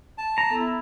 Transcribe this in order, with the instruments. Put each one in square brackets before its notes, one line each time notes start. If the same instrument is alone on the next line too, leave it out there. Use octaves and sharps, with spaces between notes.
[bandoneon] A5
[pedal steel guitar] A#5
[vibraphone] B3 A4 [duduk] E4